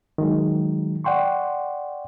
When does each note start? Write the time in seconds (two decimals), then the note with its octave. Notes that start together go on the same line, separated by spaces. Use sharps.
0.18 D#3 F#3 G#3
1.04 D5 F#5 G5 C6 C#6